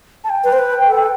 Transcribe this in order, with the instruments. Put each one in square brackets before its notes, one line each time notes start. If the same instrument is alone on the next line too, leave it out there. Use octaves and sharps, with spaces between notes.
[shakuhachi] A5
G5
[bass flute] B4
C5
B4
A4